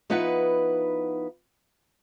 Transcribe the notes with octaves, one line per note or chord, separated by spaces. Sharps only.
F3 B3 D#4 E4 B4 F#5